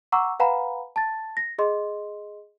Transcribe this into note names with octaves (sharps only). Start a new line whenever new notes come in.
F#5 A#5 C#6 D6 E6
B4 F5 F#5 G#5 A#5 B5
A5 A6
A#6
G#4 D#5 C6